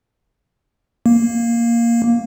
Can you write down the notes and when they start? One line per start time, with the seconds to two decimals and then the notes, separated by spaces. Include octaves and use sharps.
1.06 A#3